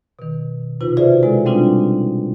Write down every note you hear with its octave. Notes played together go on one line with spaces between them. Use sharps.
B2 D#3
C3 D#4 F4 B4
F4 F#4 G#4 C5 D5 E5
B2 G#3 E4 A4
G3 G#3 C4 D4 D#4 F4